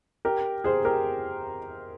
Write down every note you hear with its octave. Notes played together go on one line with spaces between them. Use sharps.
G4 A#4
G#4 C5
G4 A#4